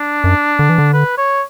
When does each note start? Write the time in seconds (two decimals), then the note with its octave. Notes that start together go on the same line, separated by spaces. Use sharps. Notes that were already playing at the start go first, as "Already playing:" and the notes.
Already playing: D4
0.24 F#2
0.59 D3
0.69 E3
0.78 D3
0.94 B4
1.17 C#5